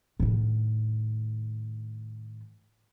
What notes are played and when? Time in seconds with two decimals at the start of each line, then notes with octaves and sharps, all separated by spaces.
0.20 A2 D#3